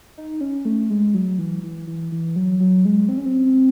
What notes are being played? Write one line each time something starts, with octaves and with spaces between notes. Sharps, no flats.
D#4
C#4
A3
G#3
F#3
E3
E3
E3
E3
F#3
F#3
G#3
C4
C#4
C4